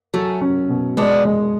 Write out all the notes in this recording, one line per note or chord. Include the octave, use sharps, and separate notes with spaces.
F#3 A3 C#4
C#4
B2
G#3 B3 D4
G#3